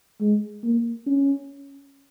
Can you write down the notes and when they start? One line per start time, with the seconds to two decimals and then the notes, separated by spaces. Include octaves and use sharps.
0.20 G#3
0.64 A#3
1.07 C#4